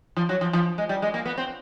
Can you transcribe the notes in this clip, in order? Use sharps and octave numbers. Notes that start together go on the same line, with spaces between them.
F3
F#3
F3
F3
G#3
G3
G#3
A#3
B3
C4